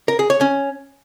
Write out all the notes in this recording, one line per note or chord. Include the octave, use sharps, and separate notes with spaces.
A#4
G#4
C#5
C#4